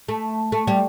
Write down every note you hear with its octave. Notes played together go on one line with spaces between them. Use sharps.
A3
A3
G3